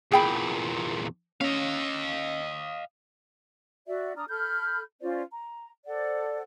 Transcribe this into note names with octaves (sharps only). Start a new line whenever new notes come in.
E2 A#2 G#4 G5 B5
C#4 D#5 F5
F#4 D5 E5
D4 A#5 D#6 F6
A4 B5 F6 G6
C#4 F4 C5 D5
A#5
A4 C5 D5 F#5